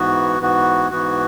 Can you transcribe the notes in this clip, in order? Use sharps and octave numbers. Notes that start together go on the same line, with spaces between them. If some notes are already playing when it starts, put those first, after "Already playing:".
Already playing: G#2 E3 B3 F#4
G#2 E3 B3 F#4
G#2 E3 B3 F#4